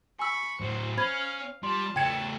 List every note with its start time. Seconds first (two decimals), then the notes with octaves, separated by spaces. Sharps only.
0.19 G#5 B5 C#6 E6
0.61 A2 F#3 C5
0.97 C#4 C5 F5 B5 G#6
1.63 G3 F4 A5 C6
1.96 C#3 A3 G5 A5 G#6 C#7